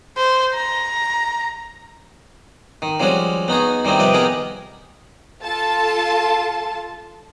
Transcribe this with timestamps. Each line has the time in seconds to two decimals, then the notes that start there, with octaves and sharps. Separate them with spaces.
0.17 C5
0.55 A#5
2.82 D#3
3.00 F3 G3 G#3 C#4 F#4
3.48 B3 D#4 F#4 G#4
3.85 D#3 G3 C4 D#4 E4
3.99 C3 F3 G3 B4 D#5 G5
4.14 B3 D#4 G4 G#4 A#4
5.43 F4 A4 A5